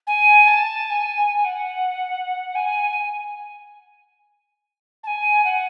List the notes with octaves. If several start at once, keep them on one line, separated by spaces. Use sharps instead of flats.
G#5
A5
G#5
G#5
F#5
G#5
A5
G#5
F#5